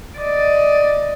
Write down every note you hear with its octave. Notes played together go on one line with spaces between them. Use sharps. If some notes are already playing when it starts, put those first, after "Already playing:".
D5 D#5